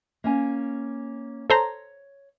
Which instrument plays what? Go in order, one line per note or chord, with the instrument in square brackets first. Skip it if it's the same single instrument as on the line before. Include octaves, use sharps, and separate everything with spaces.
[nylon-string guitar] A#3 C#4 G#5
[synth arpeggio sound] A4 C5 A#5 [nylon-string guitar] C#5